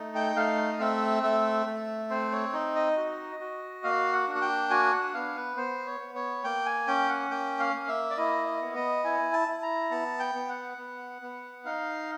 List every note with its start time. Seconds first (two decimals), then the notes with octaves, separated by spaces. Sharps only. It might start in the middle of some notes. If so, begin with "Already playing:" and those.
Already playing: A3 D#4
0.15 G5
0.36 A3 F5
0.72 D#5
0.80 C4 E5
1.23 A3 E5
1.66 A3
2.10 C4 C5
2.32 C#5
2.53 D#4
2.76 D#5
2.97 F#4
3.40 F#4
3.84 A#3 F5
4.13 F#5
4.27 D4
4.35 F#5
4.41 G5
4.70 F#4 G#5
4.92 F#5
5.14 B3 F5
5.36 B4
5.57 B3 C5
5.86 C#5
6.00 B3
6.15 C#5
6.44 A#3 G5
6.66 G#5
6.87 C#4 G5
7.09 F#5
7.30 A#3 G5
7.60 F5
7.74 A#3
7.88 E5
8.10 D5
8.17 E4 D#5
8.47 D#5
8.61 B3
8.75 D#5
9.04 E4 G#5
9.33 A5
9.48 E4
9.63 A#5
9.91 B3 A5
10.20 G5
10.35 B3
10.49 F#5
10.78 B3
11.22 B3
11.65 D#4 F5